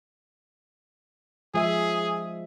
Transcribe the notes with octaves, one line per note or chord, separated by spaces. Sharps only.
F3 G#3 G#4 E5